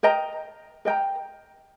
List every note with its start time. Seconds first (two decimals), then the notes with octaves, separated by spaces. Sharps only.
0.03 A#4 D#5 G5 A#5
0.85 A#4 D#5 G5 A#5